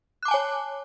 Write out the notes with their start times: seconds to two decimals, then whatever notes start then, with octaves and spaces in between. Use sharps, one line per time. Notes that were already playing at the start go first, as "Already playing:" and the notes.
0.23 F#6
0.25 D6
0.28 A5
0.31 G#5
0.34 C#5